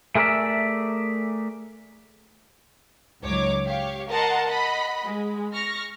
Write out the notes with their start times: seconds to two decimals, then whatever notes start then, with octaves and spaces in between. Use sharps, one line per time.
0.15 A3 G#4 A#4 B4 D5 E5
3.23 C#2 G#2 F#3 C#5 D6
3.66 G4 C#5 F5
4.11 A#4 D#5 F#5 A5 A#5 C6
4.48 D#5 F#5 B5
5.03 G#3
5.55 C#6 F6 A#6